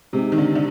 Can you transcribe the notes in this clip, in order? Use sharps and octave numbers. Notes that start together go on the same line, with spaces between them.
C3 G#3 C4 D#4
D#3
D3
D3